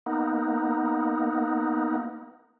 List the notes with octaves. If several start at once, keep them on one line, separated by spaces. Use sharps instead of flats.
A#3 B3 D#4